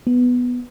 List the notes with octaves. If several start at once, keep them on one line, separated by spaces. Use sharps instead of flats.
B3